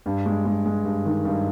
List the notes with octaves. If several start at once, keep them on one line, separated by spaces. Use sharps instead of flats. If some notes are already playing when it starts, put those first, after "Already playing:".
G2
G#3
G#3
G#3
G2
D#3
G2